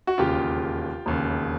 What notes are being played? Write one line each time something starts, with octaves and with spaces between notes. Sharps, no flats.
F#4
E1 D#2 C#3 F4 G4
E1 D#2 C#3